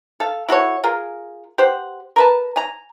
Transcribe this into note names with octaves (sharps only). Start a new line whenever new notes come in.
A4 F5
E4 F#4 A4 C#5
F4 G#4 A#4
G4 C5 F#5
A#4 B4 A5
G#5 A#5